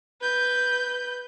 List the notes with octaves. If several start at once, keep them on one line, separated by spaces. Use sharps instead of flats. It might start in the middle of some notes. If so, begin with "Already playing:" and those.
B4 G6